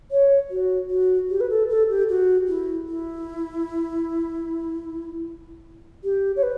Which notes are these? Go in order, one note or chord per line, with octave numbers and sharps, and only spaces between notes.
C#5
F#4
F#4
G4
B4
A4
A4
G4
F#4
E4
E4
G4
C#5
B4